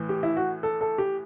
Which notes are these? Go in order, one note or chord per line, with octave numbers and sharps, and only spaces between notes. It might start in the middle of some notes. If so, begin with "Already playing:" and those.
Already playing: A2 E3
G4
E4
F#4
A4
A4
G4